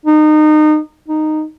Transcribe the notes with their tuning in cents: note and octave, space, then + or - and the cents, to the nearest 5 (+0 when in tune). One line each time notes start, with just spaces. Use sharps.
D#4 -25
D#4 -10